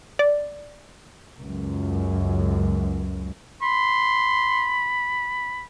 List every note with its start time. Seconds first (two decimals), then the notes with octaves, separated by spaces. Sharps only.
0.19 D5
1.38 C#2 F#2
3.62 B5 C6